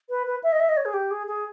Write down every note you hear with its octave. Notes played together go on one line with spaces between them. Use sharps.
B4
B4
E5
D#5
E5
D#5
C#5
G#4
G4
G#4
G#4